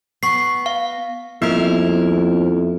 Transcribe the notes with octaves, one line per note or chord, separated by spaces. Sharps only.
B3 C#6 C7
F5
F2 A#3 B3 E4 A#4